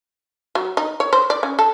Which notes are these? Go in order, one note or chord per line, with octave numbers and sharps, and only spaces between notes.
F#3
D#4
C#5
C5
D5
C#4
A4